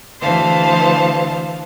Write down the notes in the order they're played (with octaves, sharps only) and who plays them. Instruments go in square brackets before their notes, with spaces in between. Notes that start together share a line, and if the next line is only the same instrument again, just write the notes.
[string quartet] D2 E3 C5 F5 A5